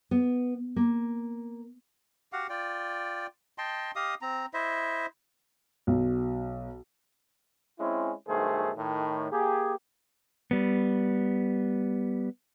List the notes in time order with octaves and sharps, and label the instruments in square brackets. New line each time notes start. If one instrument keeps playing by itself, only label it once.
[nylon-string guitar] B3
A#3
[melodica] F#4 G4 F5 F#5
F4 D5 G5
D#5 G5 A5 C6
G4 D#5 F5 D#6
C4 A#5
E4 C5 D#5 E5
[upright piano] B1
[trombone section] G#3 C4 C#4 E4
B1 G2 D#3 A3 G#4 C5
A2 D#3
A#3 G4 G#4
[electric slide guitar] G3 B3